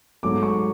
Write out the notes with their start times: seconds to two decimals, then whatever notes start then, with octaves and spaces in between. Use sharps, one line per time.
0.23 G#2 F#3 A3 D6
0.43 C#6